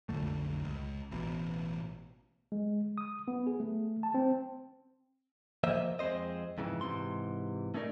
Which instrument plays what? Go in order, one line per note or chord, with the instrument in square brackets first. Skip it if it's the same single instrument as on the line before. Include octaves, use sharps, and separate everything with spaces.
[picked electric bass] B1 F2 D3 A3
C#2
A1 B2
[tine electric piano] G#3
D#6
B3
G#4
A3
A5
C4
[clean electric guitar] F3 A#3 C5 D#5 E5
F2 G#3 C4 C5 D#5
F2 G#2 C#3 E3
G#2 C3 E3 C6
A3 C#4 D#4 A#4 D5